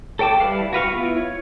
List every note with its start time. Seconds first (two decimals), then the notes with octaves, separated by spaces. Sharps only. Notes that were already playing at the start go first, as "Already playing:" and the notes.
0.19 A4 C#5 G5 A5 D6
0.40 G3 E4 B4 F5
0.73 F#4 B4 F5 C#6
0.91 B3 E4 F4
1.17 C#5